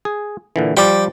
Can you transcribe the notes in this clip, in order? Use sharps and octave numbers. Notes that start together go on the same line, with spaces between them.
G#4
A#2 D3 E3
F3 G3 F4 D5 G5